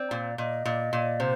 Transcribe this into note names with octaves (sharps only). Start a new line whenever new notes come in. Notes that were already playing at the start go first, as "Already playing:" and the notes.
Already playing: C4 D5
A#2
A#2 D#5
A#2
A#2
C3 C5